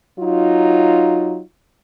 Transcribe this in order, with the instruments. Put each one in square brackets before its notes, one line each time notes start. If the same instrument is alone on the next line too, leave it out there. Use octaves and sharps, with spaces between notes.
[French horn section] F#3 D#4 F4